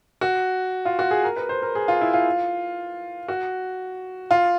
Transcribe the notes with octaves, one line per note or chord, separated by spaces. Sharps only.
F#4
F4
F#4
G#4
A#4
B4
C5
A#4
G#4
F4
E4
F4
F#4
F4